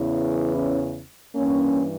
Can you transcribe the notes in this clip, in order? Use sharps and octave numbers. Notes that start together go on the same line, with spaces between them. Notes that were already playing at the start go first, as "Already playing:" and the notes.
Already playing: E2 C#3 E3
C#4 E4
G2 E3 A#3 C#4